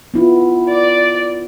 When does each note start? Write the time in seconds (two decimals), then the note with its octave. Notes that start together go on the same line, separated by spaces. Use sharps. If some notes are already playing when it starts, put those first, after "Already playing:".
0.14 B3 E4 F4
0.73 D5